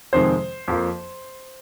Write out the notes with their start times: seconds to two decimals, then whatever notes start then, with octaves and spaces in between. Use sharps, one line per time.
0.13 F2 C3 D#3 G#3 C4 C5
0.68 F2 F3 A#3